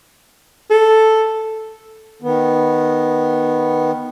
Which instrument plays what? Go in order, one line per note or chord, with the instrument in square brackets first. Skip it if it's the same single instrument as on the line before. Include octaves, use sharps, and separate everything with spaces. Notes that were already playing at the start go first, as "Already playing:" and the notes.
[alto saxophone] A4
[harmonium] D#3 B3